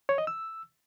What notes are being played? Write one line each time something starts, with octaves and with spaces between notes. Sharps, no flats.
C#5
D#5
E6